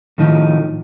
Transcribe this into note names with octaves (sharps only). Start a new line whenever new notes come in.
A2 D#3 F3 D#4